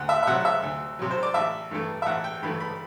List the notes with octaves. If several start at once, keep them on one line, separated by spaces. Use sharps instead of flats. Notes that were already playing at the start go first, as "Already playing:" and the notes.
Already playing: D2 F#5
E5
E5
C3 F#3 F#5
E5
D2
C3 F#3
C5
D5
A1 E5
G2 E3 A3
E5
A1 F#5
G5
G2 E3 A3 B5
B5